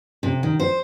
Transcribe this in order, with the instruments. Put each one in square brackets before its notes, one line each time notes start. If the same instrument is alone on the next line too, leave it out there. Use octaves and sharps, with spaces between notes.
[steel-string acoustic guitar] C3
D#3
C5